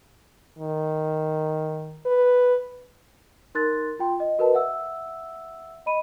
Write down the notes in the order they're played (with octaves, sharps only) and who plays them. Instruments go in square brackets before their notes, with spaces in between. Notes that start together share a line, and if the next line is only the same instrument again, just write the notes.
[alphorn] D#3
B4
[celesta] D#4 A#4 C6 F#6 A6
F4 G5 C6
D#5
F#4 A#4 B4 D#5 A5
E5 F#5 E6
D#5 B5 D#7